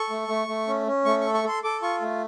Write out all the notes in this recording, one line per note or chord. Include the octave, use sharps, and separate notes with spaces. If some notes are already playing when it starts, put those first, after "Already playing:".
Already playing: A4 C#6
A3
A3
A3
C#4
C#4
A3 C#6
A4 C#6
C#6
A4 C6
A4 D6
F4 C#6
A3